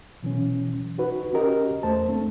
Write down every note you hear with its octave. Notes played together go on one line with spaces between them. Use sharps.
B2 E3 F#3 C#4
D#4 F#4 B4
C#4 F#4 G4 A#4 D#5
E2 A3 C5 A5
A3 C4 D4